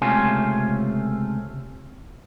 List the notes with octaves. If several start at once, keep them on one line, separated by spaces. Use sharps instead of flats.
C#2 C3 A3 C#4 F4 G#5